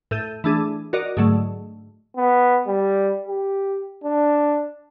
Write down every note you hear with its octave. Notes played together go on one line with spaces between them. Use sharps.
A2 A4 G6 D#7
E3 A3 D4 G#4
F#4 A#4 D5 D#5
G#2 D3 F#3 A3
B3
G3
G4
D4